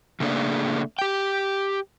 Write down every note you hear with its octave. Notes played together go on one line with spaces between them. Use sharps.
C#3 A3 A#3 D4 G#4 D5
G4 G5